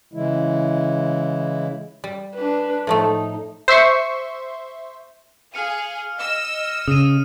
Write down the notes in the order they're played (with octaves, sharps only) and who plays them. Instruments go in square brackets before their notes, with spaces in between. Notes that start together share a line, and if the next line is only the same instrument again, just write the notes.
[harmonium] C#3 E3 G#3 E4
[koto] G3
[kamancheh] D4 B4
[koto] A2 F3 A3 [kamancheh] D#4
[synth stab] C5 E5 C6 C#6
[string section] G#4 F5 [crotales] F6 C#7 D#7
[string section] D#5 E6 [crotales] F6
[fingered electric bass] C#3 [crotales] D#6 D#7